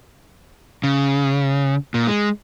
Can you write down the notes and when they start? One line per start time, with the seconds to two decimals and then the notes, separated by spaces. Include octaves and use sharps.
0.84 C#3
1.94 A#2
2.07 G#3